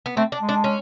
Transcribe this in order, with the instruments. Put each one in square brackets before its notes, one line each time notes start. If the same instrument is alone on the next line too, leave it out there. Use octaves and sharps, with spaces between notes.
[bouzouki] B3
[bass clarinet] A3 [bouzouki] C4
[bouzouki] D4
[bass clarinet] G#3
[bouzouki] D4
C#4